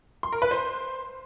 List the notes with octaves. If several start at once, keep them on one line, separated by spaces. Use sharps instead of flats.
C6
A#4
B4
C5